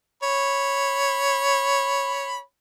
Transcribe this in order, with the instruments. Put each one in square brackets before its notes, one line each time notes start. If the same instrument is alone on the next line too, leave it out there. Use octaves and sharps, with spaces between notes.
[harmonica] C#5 B5